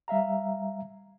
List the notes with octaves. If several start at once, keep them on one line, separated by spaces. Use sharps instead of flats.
G3 E5 F5 A#5